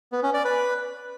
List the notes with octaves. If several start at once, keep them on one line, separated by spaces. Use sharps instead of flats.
B3
C#4
D5
B4